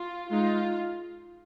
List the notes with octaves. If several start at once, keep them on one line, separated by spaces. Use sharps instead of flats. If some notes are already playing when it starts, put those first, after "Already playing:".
Already playing: F4
G#3 D#4 F4